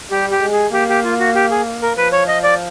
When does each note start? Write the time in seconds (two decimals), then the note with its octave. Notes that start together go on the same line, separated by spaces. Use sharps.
0.11 G3 G4
0.31 G4
0.42 G#3
0.52 G#4
0.73 A#3 G4
0.89 G4
1.04 F4
1.20 F#4
1.35 G4
1.51 G#4
1.82 A#4
1.97 F3 B4
2.13 C#5
2.28 D#5
2.43 D5